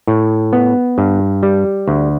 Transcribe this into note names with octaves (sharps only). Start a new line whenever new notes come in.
A2
B3
G2
G3
D2